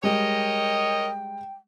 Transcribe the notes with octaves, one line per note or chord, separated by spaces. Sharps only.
G3 G#3 A#4 C#5 D#5 G5